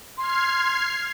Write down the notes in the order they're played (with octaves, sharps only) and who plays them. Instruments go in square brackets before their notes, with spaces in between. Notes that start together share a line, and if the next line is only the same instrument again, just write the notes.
[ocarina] C6 [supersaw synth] F6 G#6 C7